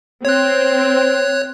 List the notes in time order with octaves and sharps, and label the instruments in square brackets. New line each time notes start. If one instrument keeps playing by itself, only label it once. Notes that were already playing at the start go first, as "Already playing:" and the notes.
[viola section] C4 [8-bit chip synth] C#5 F#6